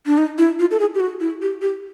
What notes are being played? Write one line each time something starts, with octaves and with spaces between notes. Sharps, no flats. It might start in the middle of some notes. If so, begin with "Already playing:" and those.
D4
D#4
E4
F4
A4
G#4
G4
F#4
E4
G4
G4